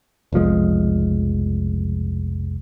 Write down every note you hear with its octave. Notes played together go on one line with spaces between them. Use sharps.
F1 B1 F3 G#3